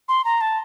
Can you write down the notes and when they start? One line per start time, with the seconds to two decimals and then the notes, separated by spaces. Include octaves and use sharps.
0.08 C6
0.24 A#5
0.41 A5